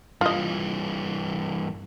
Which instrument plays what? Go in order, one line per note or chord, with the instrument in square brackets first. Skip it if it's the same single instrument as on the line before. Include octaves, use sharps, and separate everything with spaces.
[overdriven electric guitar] G2 E3 [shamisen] F4 D#5